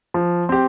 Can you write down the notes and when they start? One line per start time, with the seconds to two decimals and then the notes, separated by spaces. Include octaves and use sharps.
0.14 F3
0.49 C4 G4